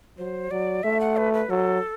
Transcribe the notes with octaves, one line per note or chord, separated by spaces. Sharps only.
F#3 C5
F#3 D5
A3 E5
F#5
B4
B4
F#3 A4